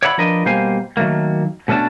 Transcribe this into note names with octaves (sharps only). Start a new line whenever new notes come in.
C#5 D5 E5 F#5 A#5 B5
F3 D4 A#4 B4 D#5
B2 G3 A#3 C5 F5 G#5
D#3 F#3 A3 A#3
B2 A3 C#4 D4 A5